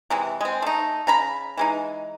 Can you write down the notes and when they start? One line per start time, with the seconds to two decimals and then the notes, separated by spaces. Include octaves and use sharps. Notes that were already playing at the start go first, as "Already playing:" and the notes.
0.10 C3 E3 G#3
0.41 G#3 C4
0.62 A3 D#4
1.07 C#3 A#5 B5
1.57 E3 G#3 D#4